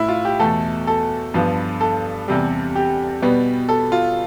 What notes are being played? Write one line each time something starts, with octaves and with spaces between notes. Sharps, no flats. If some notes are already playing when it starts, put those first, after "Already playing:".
Already playing: A2 E4
F4
G4
E2 B2 A3 A4
A4
G2 F3 B3
A4
E2 C3 G3
G4
B2 G3 B3
A4
F4